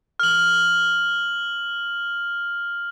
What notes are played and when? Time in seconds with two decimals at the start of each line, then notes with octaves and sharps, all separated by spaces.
0.20 F6 F#7